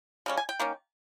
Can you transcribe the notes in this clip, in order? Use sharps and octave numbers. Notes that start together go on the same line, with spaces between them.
C#3 G3 C#4
G#5
G5
D#3 A#3 C#4